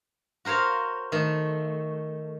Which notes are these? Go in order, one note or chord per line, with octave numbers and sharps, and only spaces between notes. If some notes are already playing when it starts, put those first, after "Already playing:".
F#4 A#4 C5 C#5 F5
D#3 A3